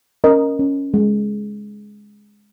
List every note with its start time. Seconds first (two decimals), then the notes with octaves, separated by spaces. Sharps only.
0.24 C#4 A#4 D#5
0.59 C#4
0.94 G#3